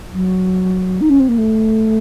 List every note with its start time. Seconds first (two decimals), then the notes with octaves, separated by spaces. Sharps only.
0.13 F#3
1.01 D#4
1.10 C#4
1.20 C4
1.29 A#3
1.38 A3